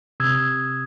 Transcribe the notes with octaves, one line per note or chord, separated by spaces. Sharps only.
C3 D#6 E6 G#6